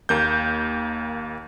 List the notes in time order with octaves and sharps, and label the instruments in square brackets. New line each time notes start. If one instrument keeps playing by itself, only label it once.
[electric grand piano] D#2 A#3 G6